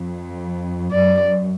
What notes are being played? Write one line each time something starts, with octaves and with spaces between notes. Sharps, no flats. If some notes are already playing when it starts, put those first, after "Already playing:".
Already playing: F2
F#2 D5